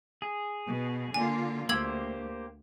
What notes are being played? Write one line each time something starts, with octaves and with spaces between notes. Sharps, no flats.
G#4
B2
D3 A#3 F4 G#5
D2 A#3 G4 C5 E6 G#6 F#7